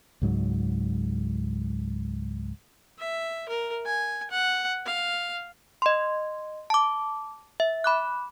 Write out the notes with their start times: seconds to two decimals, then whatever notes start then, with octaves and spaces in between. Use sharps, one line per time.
0.22 C#2 G#2 F#3
2.98 E5
3.49 A#4
3.86 G#5
4.31 F#5
4.86 F5
5.82 D#5 C6
6.70 A5 D6
7.60 E5
7.84 B5 D6 F#6